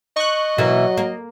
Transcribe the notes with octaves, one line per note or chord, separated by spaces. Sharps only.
D#5 C#6 F#6
B2 E3 F#3 A#3
A#3